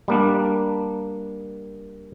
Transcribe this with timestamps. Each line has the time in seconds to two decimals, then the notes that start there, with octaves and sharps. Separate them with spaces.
0.08 G3 A#3 D4